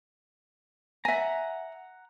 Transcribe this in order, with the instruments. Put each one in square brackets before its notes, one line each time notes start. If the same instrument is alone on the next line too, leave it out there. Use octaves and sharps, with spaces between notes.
[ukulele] E5 G#5 [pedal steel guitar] F#5 A#5